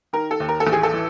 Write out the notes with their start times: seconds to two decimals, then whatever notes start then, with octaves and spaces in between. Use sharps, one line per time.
0.13 D#3 A#4
0.31 A4
0.40 D#2
0.49 A#4
0.60 A4
0.67 A1
0.72 G#4
0.83 A4
0.93 E3